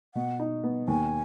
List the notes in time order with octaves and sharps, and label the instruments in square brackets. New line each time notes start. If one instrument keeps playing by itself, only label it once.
[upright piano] B2 [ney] F#5
[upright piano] D#4
B3
[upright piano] D#2 [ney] G#5